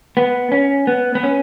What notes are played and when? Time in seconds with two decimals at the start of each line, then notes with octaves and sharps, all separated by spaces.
0.17 B3
0.52 C#4
0.87 B3
1.15 B3
1.23 C#4